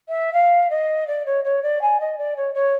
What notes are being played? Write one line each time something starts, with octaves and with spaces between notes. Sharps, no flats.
E5
F5
D#5
D5
C#5
C#5
D5
G#5
D#5
D5
C#5
C#5